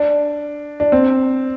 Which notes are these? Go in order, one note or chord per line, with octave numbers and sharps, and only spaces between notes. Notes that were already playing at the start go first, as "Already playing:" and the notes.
Already playing: D4
D4
C4